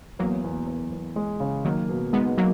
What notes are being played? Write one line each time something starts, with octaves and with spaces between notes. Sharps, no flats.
E2 F#3 A#3
E2
E2
E2
G#3
C#3
D#3 F#3 A#3
B2
G#3 B3 D#4
F#3 A#3 D#4